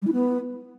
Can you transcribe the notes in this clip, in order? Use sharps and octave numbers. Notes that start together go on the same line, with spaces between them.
G3
E4
B3